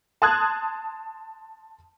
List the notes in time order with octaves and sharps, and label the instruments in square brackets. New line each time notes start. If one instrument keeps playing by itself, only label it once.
[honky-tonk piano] A5 C6 D#6 F#6 G#6